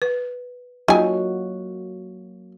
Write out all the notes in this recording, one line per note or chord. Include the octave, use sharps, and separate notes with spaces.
B4
F#3 A#3 D#4 F4 F#4 G#5